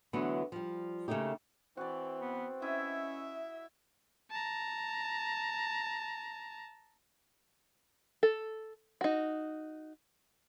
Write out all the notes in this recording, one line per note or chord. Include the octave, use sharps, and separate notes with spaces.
D3 E3 F#3 A3 B3
F3 G3
C#3 A3 A#3 D#4 G4
E3 C4 F#4 B4 D5
B3
C#4 E4 D#5 E5
A5 A#5
A4
D#4 F#4